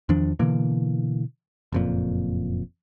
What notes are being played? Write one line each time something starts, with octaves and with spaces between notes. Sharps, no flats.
E2 D#3 F3 D4
B2 D3 E3 A#3
F#1 F2 A#2